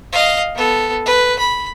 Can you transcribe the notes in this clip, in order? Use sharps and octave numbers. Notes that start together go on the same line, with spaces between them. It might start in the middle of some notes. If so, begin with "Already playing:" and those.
D#5 F5
B3 A4
B4
B5